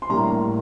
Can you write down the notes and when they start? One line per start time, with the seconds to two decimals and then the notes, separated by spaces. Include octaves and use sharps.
0.02 C6
0.09 A2 G3 A#3 D4 A#5